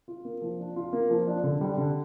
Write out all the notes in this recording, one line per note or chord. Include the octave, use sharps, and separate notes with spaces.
F4
A#3
F3
D4
F4
A#3
F3
D4
D3
G3
D3